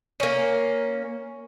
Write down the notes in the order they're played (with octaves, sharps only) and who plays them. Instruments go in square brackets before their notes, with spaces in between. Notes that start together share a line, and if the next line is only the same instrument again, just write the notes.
[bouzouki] A#3 C#4